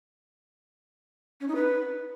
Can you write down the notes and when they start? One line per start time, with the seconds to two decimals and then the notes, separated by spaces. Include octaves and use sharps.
1.40 C#4
1.48 D#4
1.55 B4